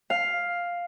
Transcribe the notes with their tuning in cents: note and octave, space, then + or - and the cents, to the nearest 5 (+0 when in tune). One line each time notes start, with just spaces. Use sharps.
F5 +5